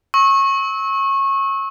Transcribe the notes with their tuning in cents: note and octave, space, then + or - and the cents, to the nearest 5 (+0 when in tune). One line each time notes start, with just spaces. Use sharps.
C#6 -25 E6 -30